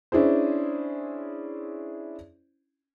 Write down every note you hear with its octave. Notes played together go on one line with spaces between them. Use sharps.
C#4 D4 E4 G#4 C5